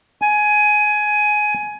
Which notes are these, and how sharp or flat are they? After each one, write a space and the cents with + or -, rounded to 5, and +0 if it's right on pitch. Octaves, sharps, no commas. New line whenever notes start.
G#5 +15